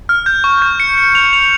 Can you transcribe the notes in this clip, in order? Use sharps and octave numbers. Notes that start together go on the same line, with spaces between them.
F6
G6
C#6
G6
C#7
C#7
F7
F7